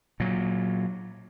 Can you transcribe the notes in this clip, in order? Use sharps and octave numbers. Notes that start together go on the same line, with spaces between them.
A#2 F#3